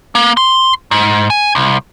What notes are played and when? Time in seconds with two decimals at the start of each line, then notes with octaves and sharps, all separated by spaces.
0.15 A#3
0.37 C6
0.91 G#2
1.30 G#5
1.55 C2